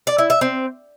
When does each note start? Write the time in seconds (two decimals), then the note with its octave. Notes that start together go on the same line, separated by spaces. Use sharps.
0.07 D5
0.18 E4
0.30 E5
0.41 C4